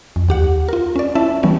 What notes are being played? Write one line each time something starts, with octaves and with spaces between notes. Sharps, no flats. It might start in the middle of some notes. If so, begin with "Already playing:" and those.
F2
D#2 G4 F#5
F4 A#4
C#4 D5
C#4 E4 E5 A5
E3 G3 B3 C#4